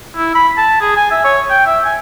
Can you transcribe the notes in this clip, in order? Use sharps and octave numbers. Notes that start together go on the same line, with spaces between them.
E4
B5
A5
G#4
G#5
E5
C#5
G5
E5
G#5